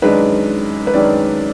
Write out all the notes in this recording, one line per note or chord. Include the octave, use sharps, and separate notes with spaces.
F#2 D#3 G#3 D4 B4
B4
F#2 D#3 G#3 D4 D5